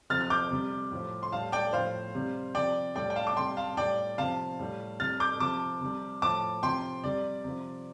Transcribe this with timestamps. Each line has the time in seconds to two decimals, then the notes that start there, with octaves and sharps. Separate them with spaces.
0.10 C3 F3 F6 A6
0.21 F6
0.30 D6 G6
0.51 C3 G3
0.92 A2 F3
1.23 C6
1.32 A2 G3 F5 A5
1.52 D5 G5
1.73 A2 F3 C5 F5
2.15 C3 G3
2.55 C3 F3 D5 G5
2.96 A2 G3 D5 G5
3.10 G5
3.16 F5 A5
3.27 D6
3.36 C3 G3 G5 C6
3.57 F5 A5
3.77 A2 G3 D5 G5
4.18 C3 F3 F5 A5
4.59 A2 G3
5.00 C3 G3 F6 A6
5.20 D6 G6
5.40 C3 F3 A5 D6
5.81 C3 G3
6.22 A2 F3 A5 D6
6.63 C3 F3 G5 C6
7.04 C3 G3 D5
7.44 C3 F3